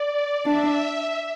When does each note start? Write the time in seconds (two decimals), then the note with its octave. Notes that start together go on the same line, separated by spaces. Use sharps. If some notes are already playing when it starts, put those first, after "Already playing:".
Already playing: D5
0.45 D4 E5